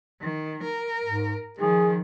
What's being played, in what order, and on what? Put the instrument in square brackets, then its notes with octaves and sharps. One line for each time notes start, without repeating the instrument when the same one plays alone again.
[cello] D#3
A#4
[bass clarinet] G#2
[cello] D#3 F3 [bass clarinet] G#4